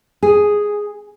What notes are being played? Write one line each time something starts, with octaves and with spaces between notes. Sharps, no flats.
G#4